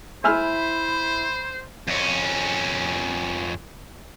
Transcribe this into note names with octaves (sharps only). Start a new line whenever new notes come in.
E4 C5 E5 G#5 B5 E6 F6
F2 C#4